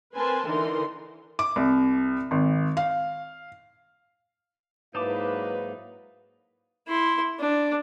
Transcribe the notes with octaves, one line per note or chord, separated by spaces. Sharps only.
C4 A#4 B4 G#5 A5 C6
D3 E3 D#4 A#4 C6
D6
C2
G#1
F5
G#2 F#3 A#3 D#4 E4 B4 A5 D6
E4 C6
D4